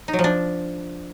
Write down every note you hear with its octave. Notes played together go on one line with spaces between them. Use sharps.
D#4
F#3
F3
D4